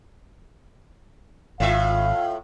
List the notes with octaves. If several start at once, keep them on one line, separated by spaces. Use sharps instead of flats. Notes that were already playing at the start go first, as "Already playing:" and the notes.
G#1 A2 F4 E5 F5